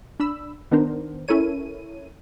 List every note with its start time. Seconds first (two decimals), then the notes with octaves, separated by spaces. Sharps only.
0.20 D4 B5 E6
0.71 D#3 B3 D4 A#4 C5
1.28 C#4 E4 A4 A#4 C#5 D#7